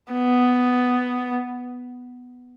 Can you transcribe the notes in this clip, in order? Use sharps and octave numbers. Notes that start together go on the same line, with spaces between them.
B3